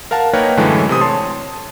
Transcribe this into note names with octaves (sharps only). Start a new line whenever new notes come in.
A#4 F5 F#5 A5
A#3 D#4 A#4 B4 C#5 G5
F#2 A2 D3 E3 G#3 A3
C3 D#6
C#5 A5 C6